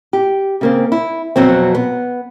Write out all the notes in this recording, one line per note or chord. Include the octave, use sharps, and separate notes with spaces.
G4
C#3 A#3 C4
E4
F2 B2 F#3 C4
B3